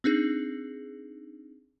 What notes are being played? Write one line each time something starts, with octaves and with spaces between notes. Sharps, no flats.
C4 D4 D#4 G#4